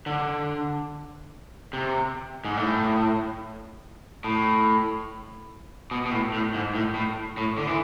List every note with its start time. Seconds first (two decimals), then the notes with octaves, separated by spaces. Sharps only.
0.06 D3
1.73 C3
2.45 G#2
2.57 A2
4.24 A2
5.91 B2
6.05 B2
6.12 A2
6.33 A2
6.54 G#2
6.75 A2
6.95 A2
7.37 A2
7.58 D3
7.67 E3